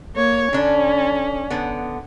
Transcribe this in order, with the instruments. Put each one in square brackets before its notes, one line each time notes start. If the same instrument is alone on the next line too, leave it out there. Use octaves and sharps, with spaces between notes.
[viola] A#3 C#5
[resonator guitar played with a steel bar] D3 D4 [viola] C#4
[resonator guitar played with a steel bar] D3 B3